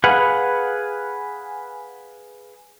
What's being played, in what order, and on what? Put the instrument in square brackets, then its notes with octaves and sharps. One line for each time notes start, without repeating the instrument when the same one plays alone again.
[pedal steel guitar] G#4 B4 F5 F#5